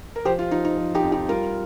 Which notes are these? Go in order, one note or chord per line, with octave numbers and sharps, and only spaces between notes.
A#4
F3 G4 C5
F4
F3 D#4
D#4
F3
D#4 G4
F2
D#4 G4
G3 F4 A#4